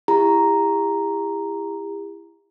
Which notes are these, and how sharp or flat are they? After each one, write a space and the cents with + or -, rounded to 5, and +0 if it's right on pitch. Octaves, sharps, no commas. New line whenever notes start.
E4 +20 G4 +45 A#5 +0